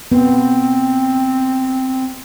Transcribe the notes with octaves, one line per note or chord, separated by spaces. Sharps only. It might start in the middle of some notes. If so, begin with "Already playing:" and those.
B3 C4